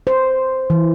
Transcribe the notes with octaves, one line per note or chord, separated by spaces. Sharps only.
C5
E3